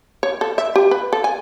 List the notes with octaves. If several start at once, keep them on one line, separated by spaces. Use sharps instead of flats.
C#5
A4
E5
G4
B4
A4
G#5